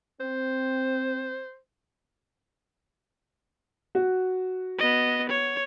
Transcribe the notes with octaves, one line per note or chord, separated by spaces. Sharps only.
C4 C5
F#4
B3 D#5
C#5